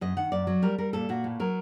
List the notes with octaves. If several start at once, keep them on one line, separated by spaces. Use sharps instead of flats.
F#2 D#5
D#3 F#5
F#2 D5
F#3
G3 A#4
G3 A#4
A#2 A4
A#2 F#4
A2
F#3 A#4